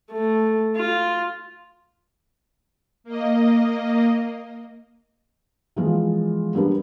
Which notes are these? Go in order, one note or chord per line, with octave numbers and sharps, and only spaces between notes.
A3
F4
A#3 D#5
E3 F3 G#3 B3 F4
G3 B3 D4 A#4 B4